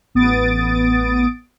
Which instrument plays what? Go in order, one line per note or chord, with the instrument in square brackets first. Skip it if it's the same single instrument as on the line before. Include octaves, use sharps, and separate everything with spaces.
[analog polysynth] A1 B3 D#6 A6 D7